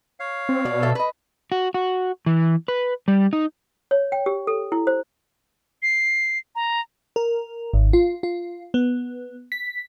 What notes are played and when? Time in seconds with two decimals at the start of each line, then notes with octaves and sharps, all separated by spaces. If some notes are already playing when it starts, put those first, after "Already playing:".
0.20 C#5 F5
0.49 C4
0.65 B2 D5
0.82 A4 E5
0.95 B4 D#5
1.52 F#4
1.74 F#4
2.26 E3
2.68 B4
3.08 G3
3.33 D#4
3.91 C#5
4.12 G5
4.26 G4
4.47 A4
4.72 E4
4.87 C5
5.83 C7
6.55 A#5
7.16 A#4
7.74 G#1
7.93 F4
8.23 F4
8.74 B3
9.52 B6